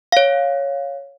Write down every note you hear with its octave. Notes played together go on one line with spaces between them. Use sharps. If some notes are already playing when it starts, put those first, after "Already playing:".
C#5 F5